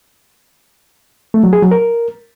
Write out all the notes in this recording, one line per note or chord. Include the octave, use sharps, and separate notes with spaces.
A3
F#3
G#4
F#3
A#4